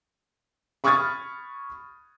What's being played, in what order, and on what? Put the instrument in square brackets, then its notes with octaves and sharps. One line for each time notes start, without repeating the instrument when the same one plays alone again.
[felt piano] B5 C#6 D#6 F6 G#6 A6